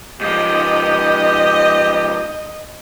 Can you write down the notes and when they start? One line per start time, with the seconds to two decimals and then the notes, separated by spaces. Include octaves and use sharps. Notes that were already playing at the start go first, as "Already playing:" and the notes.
0.21 G#2 F3 G4 D#5